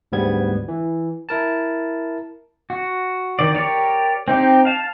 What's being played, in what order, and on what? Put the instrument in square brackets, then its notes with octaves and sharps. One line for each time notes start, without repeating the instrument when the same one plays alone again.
[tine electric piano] D2 G#2 G3 B3 G#6
E3
E4 A#4 A5
[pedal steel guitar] F#4
D#3 D5
G4 A#4 C#5 D5
C4 D#4 G4
F5 A5